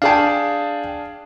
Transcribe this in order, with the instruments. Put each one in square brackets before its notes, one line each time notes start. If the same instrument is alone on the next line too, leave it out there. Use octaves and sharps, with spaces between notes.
[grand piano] D4 G#4 A5 [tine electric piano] F5 G5